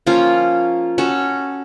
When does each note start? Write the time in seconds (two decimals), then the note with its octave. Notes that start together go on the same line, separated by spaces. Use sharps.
0.06 F3 A#3 C#4 F4
0.98 C#4 F#4 A4